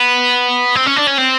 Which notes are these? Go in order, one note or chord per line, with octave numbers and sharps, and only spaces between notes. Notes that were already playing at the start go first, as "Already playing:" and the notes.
Already playing: B3
C4
C#4
D4
C#4
C4